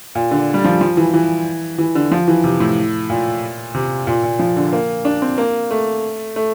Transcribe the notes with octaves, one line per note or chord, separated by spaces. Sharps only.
A#2
D3
G3
F3
F3
E3
E3
E3
D3
F3
E3
C3
A2
A#2
C3
A#2
A#2
F3
D3
A#3
D4
C4
A#3
A3
A3